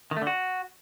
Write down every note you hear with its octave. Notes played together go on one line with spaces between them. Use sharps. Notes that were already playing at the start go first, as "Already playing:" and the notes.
D#3
A3
D3
F#4